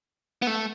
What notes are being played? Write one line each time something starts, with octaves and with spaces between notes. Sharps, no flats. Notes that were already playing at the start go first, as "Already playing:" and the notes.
B3
A3